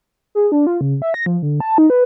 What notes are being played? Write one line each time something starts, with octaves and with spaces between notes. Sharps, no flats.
G#4
D4
F4
C#3
E5
A#6
F3
D3
A5
D#4
B4